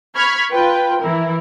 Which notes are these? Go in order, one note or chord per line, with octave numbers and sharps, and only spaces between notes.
B5 C#6 F6 G#6 B6
F4 B4 G5
E3 E4 A#4